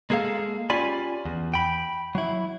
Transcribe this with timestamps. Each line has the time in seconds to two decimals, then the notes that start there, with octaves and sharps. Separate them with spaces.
0.10 G#3 A#3 G#4 A4 F5
0.70 C#4 F4 G4 D5 G#5 B5
1.25 E2
1.54 G5 B5
2.15 F#3 E4